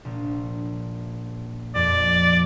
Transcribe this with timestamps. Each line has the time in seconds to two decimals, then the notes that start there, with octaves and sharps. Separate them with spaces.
0.05 A#1
1.75 F2 D5